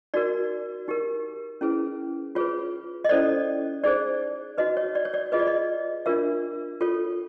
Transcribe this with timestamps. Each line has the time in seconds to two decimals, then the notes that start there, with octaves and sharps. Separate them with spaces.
0.14 D#4 F#4 A#4 D5
0.88 D#4 G4 A#4
1.61 C#4 E4 G#4 B4
2.35 F4 G#4 B4 C#5
3.05 D#5
3.09 C#4 E4 A4 C5 D5
3.84 D#4 G#4 C5 D5
4.58 D#4 F#4 B4 D#5
4.77 C#5
4.95 D5
5.05 C#5
5.14 D5
5.32 F4 G#4 B4 D#5
5.39 D5
5.47 D#5
6.06 D4 F4 A#4 C#5 E5
6.81 F4 A4 C#5